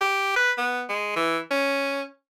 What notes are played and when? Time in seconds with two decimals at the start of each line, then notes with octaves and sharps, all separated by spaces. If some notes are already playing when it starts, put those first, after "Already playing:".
0.01 G4
0.36 B4
0.58 B3
0.89 G#3
1.16 E3
1.51 C#4